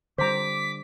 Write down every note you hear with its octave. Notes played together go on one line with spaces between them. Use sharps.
D3 G3 C5 A#5 D6 B6